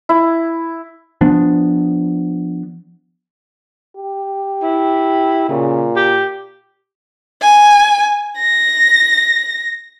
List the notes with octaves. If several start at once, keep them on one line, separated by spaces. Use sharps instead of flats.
E4
F3 B3 D4
G4
E4
A#2 C#3
G4
G#5
A#6